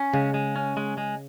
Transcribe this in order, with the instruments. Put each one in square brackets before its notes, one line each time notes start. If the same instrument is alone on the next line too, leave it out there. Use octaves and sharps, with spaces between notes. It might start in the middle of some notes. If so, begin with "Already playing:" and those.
Already playing: [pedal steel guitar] C#4
[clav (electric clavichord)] C#3 [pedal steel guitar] G#3
[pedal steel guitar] G#3
C#4
G#3
G#3